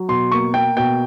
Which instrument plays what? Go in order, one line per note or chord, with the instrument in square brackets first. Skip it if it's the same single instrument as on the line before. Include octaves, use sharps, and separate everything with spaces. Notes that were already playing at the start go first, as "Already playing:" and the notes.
Already playing: [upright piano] F#3
[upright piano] B2 [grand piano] C6
[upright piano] A#3 [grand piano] C#6
[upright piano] A#3 [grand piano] G5
[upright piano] B2 [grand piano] G5